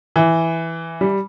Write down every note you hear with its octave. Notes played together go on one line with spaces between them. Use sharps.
E3
G3